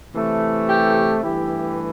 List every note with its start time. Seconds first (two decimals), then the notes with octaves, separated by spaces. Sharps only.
0.13 C3 E3 A3
0.68 G4
1.23 G2 E3 A3 E4 G4